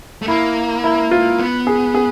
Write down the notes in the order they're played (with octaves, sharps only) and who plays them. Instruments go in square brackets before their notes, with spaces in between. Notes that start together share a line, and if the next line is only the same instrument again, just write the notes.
[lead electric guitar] A3
[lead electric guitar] A#3 [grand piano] E4
[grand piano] E4
F4
[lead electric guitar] B3
[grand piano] G#4
G#4